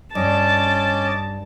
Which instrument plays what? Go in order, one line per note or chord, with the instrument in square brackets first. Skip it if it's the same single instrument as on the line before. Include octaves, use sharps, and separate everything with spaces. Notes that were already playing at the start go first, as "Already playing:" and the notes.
[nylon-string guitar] G2 [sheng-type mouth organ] C#4 D#5 D6 [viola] A5